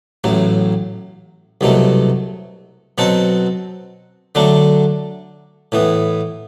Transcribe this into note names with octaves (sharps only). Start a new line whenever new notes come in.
A1 A2 F#3
C2 B2 F#3 A3
B2 F#3 C4 F#4 A4
D3 F#3 A3 D4
A2 E3 B3